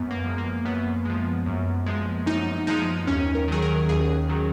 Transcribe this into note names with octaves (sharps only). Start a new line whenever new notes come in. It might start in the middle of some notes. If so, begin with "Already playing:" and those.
Already playing: F#2 B3
A#3
F3 G#3
A#3
F#2 B3
F3 G#3
F#2
F3 G#3
F#2 D#4
F3 G#3 D#4
D#2 C#4
A#4
D#3 F#3 G#4
A#4
D#2 G#4
D#3 F#3